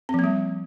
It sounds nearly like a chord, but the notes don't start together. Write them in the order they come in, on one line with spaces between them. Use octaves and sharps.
C4 F3 A#3 G3